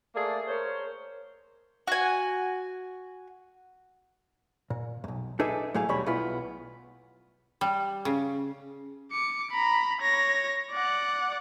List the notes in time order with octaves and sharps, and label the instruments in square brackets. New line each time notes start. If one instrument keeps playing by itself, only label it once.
[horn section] A3 A#3 G#4 A4 D5
A#4 C5 C#5
[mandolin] F#4 G#5
[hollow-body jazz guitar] A#2
B1 F#2
D4 D#4 G#4 A4 B4 E5
A2 F#3 A3 G#4 F5
D#2 B2 G3 C#5 B5
B1 B3 E4 F4 B5
[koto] G3
C#3
[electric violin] D6 C#7
A#5 B5
C#5 A#6
D5 F#5